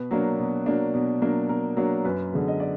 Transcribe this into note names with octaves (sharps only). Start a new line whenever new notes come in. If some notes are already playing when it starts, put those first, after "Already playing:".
Already playing: B2 B4
F#3 A#3 D4
B2
F#3 A#3 D4
B2
F#3 A#3 D4
B2 A#4
F#3 A#3 D4
F#2 B4
D3 G#3 B3
D#5
D5